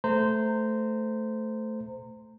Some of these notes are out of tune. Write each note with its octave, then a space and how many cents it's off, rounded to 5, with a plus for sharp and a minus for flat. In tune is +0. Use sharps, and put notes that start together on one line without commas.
A3 +0 C5 -15 A#5 -25